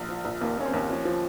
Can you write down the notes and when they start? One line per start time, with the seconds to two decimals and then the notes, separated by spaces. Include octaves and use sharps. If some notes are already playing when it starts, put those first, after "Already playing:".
Already playing: A#1
0.09 F3
0.25 A#1
0.41 D#2 A#3
0.57 D#2 C#4
0.66 C4
0.73 D#2
0.89 F3 C#4
1.05 F3